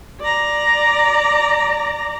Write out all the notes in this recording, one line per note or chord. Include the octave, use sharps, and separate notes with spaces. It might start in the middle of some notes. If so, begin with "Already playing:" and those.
D5 A#5